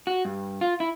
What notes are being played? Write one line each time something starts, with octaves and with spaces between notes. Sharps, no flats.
F#4
G2
F4
E4